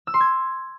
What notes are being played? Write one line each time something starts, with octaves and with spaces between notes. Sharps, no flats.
E6
C6
G#6